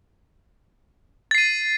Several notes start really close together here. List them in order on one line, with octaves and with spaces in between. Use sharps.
A6 C7 D#7